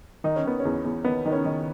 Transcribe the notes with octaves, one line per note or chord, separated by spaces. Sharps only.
D#3 D#4
C#4
D#3 B3
C#4
E2
E2
D#3 B3
D#3 D#4
C#4
D#3